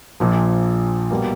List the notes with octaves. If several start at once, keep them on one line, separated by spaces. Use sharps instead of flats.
A#1 A#2 F3
B2 G3 A#3